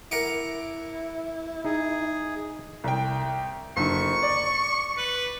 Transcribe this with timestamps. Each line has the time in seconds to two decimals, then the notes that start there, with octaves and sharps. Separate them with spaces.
0.11 E4 A#4 F#5 D6
1.65 D#4 G#4
2.84 C2 G5
3.77 F#1 D3 C#6
4.23 D5
4.97 B4